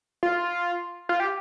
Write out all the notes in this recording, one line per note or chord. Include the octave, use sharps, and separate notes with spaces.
F4
F4
G4